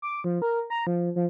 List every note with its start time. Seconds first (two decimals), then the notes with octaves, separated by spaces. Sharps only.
0.02 D6
0.24 F3
0.42 A#4
0.70 A#5
0.87 F3
1.16 F3